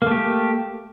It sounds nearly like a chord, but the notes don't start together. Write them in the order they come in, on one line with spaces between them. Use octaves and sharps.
A#3 A3 G4